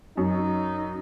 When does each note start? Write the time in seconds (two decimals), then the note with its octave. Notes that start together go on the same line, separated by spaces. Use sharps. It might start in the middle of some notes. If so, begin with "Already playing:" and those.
0.17 F#2 D#4